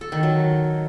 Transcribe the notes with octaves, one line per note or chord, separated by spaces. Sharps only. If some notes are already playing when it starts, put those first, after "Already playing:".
A4
D#3
F#3